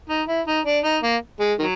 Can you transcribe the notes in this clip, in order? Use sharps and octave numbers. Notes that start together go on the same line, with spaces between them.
D#4
E4
D#4
D4
D#4
A#3
G#3
D#3 F#3